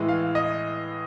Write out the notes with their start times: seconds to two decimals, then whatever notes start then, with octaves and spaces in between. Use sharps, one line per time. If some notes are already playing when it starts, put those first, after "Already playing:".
Already playing: A2 E3 G#3
0.09 F5
0.35 D#5